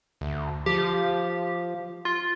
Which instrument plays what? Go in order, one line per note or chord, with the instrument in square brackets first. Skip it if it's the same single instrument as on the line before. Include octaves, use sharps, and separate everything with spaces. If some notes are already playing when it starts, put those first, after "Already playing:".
[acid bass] D2
[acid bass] F3 [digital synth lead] G4
[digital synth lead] F4